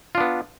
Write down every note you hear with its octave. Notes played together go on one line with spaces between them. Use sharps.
B3 D4 F4